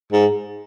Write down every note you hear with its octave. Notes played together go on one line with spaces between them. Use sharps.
G#2